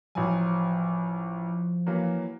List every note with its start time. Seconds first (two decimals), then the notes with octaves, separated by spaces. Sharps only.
0.15 A1 F3 F#3 G#5
1.87 E3 F#3 A#3